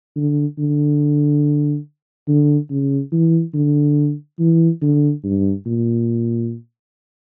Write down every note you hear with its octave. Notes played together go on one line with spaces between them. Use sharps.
D3
D3
D3
C#3
E3
D3
E3
D3
G2
A#2